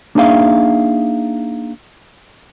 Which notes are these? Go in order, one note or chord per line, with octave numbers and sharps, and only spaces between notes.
A#3 D4 D#4 G#4 E5 F5